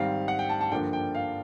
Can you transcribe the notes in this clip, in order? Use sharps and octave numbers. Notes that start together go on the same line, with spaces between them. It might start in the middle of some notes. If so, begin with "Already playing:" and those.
Already playing: G#2 D#3 G3 C4 F5
F#5
G5
A5
A5
G2 D3 F3 A#3 D4 G5
G5
F5